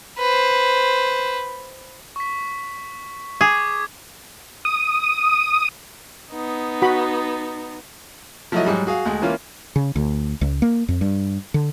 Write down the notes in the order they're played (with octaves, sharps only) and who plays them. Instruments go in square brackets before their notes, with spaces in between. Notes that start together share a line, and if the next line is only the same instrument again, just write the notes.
[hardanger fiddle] B4 C5
[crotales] C#6 B6
[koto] G#4 [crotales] D6 G#6
[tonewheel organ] D#6
[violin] B3 D#4
[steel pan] F#4 B5
[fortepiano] F3 F#3 A3 E4 F#4 D#5
G#2 F#3 G3
F#4 G#4 F5
D2 G#3
E3 A#3 C#4 F4
[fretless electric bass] C#3
D2
C#2
A#3
F2
G2
D3